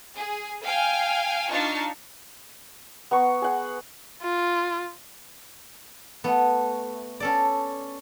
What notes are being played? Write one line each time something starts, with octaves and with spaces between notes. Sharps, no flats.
G#4
F5 G5 G#5 F6
D4 D#4 F4 A5 C#6 F6
B3 A#5 C#6
G#4 F#5
F4
A3 B3
C#4 A4 D5